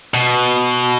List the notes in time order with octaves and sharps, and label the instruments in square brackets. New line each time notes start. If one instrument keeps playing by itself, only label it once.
[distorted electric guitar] B2